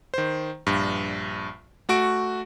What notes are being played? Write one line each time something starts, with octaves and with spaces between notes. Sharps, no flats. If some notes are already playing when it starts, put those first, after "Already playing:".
D#3 C5
A#1 G2
A3 F#4 C#6 D7